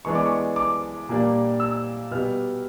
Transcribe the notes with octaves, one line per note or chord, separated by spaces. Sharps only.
E3 G#3 B3 D4 C#6
D6
C#6
D6
A#2 G3 A#3 D4
E6
B2 G3 B3 F6